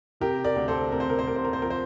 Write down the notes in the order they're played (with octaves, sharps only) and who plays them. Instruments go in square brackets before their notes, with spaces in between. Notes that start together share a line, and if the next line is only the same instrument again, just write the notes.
[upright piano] C3 G4 A#4
A#4 D5
D2
A4 C5
C3 A#4
C5
A#4
C5
C3 A#4
C5
A#4
C5
F3 A#4
C5